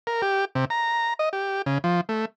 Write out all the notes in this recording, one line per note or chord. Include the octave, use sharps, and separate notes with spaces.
A#4
G4
C3
A#5
D#5
G4
C#3
F3
A3